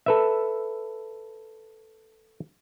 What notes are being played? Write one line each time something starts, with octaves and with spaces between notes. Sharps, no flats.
A4 B4 E5